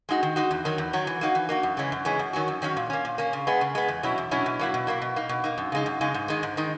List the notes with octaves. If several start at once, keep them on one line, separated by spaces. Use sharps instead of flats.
G#3 D#4 F#4
D#3
G#3 D#4 F#4
E2
D#3 F#3
E2
D#3 F#3
E3
A#3 D#4 F#4
E3
A#3 D#4 F#4
F#2
C#3 E3 G#3 C#4
F#2
C#3 E3 G#3 C#4
F#2
D#3 F#3 C#4 F#4
F#2
D#3 F#3 C#4 F#4
A#2
A#3 C#4
A#2
A#3 C#4
C#3
G#3 B3
C#3
G#3 B3
E2
B2 F#3 C#4 E4
E2
B2 F#3 C#4 E4
B2
F#3 A#3 E4
B2
F#3 A#3 E4
B2
A#3 D#4
B2
A#3 D#4
F#2
C#3 G#3 D#4
F#2
C#3 G#3 D#4
G#2
D#3 G#3 D#4
G#2
D#3 G#3 D#4